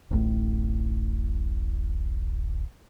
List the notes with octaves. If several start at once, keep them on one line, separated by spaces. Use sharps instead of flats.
D1 A1 A2